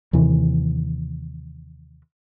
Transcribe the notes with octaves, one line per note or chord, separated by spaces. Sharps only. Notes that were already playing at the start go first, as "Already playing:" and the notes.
D#2 C3 E3